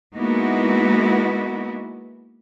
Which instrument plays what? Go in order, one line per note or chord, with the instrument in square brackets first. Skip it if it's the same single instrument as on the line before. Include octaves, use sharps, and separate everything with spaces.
[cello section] G#3 A#3 B3 D#4 E4 F#4